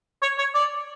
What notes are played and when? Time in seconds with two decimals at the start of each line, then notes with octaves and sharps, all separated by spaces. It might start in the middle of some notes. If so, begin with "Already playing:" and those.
0.23 C#5
0.39 C#5
0.55 D5